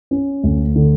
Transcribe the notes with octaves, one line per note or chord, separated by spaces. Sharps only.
C#4
D2
D3